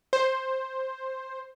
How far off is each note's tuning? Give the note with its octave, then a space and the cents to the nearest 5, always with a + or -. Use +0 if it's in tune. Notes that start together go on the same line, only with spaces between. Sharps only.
C5 +10